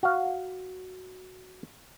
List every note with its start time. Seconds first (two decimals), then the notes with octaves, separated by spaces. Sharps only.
0.03 F#4 F5